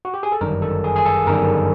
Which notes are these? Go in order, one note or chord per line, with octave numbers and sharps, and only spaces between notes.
F#4
G4
G#4
A4
G1 F#2 D#3 G3 A#4
A4
G#4
G#4
A4
G1 F#2 D#3 G3 A#4